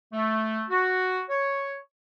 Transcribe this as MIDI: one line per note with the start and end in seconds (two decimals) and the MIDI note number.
0.13 0.62 57
0.70 1.21 66
1.29 1.73 73